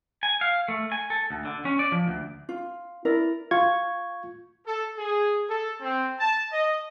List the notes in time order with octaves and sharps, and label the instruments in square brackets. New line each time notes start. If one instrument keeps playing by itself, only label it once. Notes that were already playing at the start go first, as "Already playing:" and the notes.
[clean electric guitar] G#5
F5
A3
G#5
A4
D2
D3
C#4
D5
F3
D2
[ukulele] F4
E4 A#4 D5
[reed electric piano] F4 C#6 G#6
[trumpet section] A4
G#4
A4
C4
A5
D#5